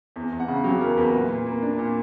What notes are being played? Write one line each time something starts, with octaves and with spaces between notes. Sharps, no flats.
E2
E2
F#5
C#3
F#3 G4
E2 A#4
E2 B4
A#2
A#2
A#3
D4
A#2